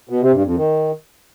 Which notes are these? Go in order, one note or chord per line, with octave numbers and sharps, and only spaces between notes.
B2
C3
G2
F2
D#3